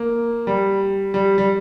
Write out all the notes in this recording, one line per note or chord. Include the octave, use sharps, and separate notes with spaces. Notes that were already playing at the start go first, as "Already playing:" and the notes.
Already playing: A#3
G3
G3
G3